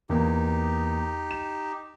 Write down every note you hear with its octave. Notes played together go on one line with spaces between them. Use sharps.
E2 A#3 D#4 G4
E7